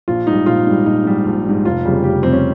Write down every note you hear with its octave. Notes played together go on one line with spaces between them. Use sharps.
A#1 F4
G#2 G3 D#4
A#1 F4
G#2 G3
A#1 D#4
G#2 G3
A#1
G#2 G3
F1 F4
F2 C#3 G3
F1 G4
F2 C#3 G3 C4
C#4